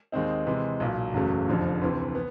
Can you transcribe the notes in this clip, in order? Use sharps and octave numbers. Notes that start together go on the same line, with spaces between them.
D#2 D#3 G#3 C4 D#4
C3 E3 G#3
B1 A#2 F#3
F#1 E2 C#3 F#3 A3
F1 F2 D3 F3
D2 C3 E3
B3